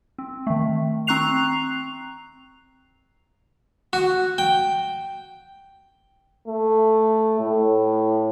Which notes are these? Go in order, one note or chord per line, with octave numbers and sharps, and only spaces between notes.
C4
D#3 A3
C4 A#5 C#6 F#6 C7 F7
F#4
G5
A3
A2